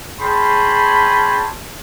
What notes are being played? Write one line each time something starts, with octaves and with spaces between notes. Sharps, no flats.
C#4 G#4 G5 A5 B5 C6